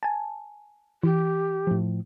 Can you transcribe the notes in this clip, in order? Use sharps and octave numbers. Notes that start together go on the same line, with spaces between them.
G#5 A5
E3 G4
A2 F3